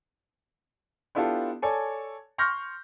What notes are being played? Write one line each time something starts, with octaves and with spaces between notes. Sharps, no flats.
B3 D4 E4 F4 G4 A4
A4 C#5 D5 G#5
C6 C#6 F6 G6 A#6